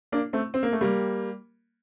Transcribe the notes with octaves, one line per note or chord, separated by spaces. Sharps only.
A#3 D4
A3 C4
C4
A#3
A3
G3 A#3